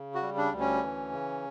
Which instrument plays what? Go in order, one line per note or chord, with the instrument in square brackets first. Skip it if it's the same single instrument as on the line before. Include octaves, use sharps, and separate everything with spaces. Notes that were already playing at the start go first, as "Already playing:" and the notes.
Already playing: [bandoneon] C#3
F#4
G3
D4
D2
C#4
E3
C#3